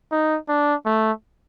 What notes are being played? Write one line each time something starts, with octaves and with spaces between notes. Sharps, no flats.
D#4
D4
A3